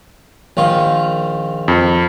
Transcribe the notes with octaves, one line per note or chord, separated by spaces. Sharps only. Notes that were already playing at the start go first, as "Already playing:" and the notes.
A#1 D#3 F4
F2